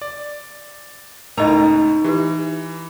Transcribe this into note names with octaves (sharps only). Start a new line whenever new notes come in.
D5
C#2 A2 D#4 A#4 D#5 A#5 B5
E3 G4 B4